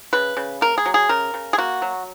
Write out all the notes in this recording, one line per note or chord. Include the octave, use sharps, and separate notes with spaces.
C#3 B4
C#3
A#3 A#4
G#4
F#3
G#4
C#3 A#4
C#3
G#4
A#3 F#4
F#3